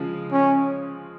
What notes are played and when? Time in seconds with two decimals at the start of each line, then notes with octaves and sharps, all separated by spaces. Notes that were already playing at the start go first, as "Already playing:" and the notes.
Already playing: C#3 F3 G#3
0.32 C#4